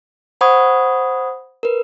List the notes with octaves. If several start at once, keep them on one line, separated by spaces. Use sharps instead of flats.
C5 F#5 B5 C#6 D#6 G#6
A#4 B4